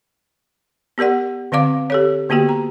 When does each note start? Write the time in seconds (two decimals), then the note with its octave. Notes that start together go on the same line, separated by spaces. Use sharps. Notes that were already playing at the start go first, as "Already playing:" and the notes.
0.98 B3 G4 A#4 D5 F#5
1.52 D3 C4 D5 F5 D6
1.90 G4 A4 C#5
2.29 D3 A#3 B3 F#4 G4 G5
2.49 A#5